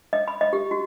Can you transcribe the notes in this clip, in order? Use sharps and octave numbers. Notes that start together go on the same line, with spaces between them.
D#5
B5
D#5
G4
F#4